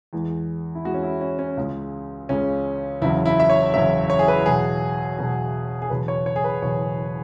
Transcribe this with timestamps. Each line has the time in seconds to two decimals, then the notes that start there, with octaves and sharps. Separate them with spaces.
0.13 E2 E3 G#3
0.75 E4
0.85 E2 E3 G#3 F#4
0.94 C#4
1.03 E4
1.21 C#4
1.39 C#4
1.57 C#2 C#3 G#3
2.29 C#2 C#3 G#3 C#4
3.01 F#1 E2 C#3 F#3 E4
3.25 E4
3.40 E5
3.50 C#5
3.74 F#1 E2 C#3 F#3 E5
4.10 C#5
4.19 G#4
4.28 B4
4.46 E2 B2 F#3 G#4
5.18 E2 B2 F#3
5.82 G#4
5.90 F#1 E2 B2 B4
6.08 C#5
6.26 C#5
6.36 G#4
6.44 B4
6.62 F#1 E2 B2 C#5